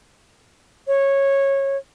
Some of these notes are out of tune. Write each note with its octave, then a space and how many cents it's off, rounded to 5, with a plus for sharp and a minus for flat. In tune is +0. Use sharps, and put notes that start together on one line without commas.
C#5 -15